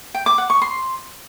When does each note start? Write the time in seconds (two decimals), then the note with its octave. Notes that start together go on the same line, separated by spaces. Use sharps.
0.14 G5
0.26 D6
0.38 F#5
0.50 C#6
0.62 C6